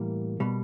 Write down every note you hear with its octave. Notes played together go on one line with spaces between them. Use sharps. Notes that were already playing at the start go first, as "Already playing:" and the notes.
Already playing: A2 E3 G3 A#3 A#4
B2 G3